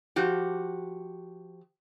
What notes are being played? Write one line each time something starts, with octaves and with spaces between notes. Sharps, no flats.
F3 F#4 G4